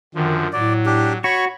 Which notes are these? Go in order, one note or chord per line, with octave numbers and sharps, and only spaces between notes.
F#2 D3 D#3 F3
A2 F#3 D5
D4 G4
F#4 C#5 B5 C#6